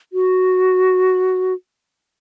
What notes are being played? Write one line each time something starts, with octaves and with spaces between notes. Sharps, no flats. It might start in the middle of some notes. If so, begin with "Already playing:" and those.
F#4